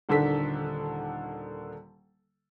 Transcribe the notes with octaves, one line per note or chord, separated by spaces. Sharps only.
D#1 D3 D#3 D4 A4 B6